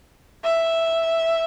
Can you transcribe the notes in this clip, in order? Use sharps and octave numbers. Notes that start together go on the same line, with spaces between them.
E5